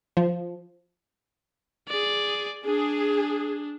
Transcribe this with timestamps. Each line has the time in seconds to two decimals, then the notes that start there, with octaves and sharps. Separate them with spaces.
0.17 F3
1.88 G#4 D5
2.66 D4 G#4